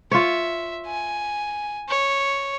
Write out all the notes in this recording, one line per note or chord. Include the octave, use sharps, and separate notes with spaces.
F4 C#5 E5
G#5
C#5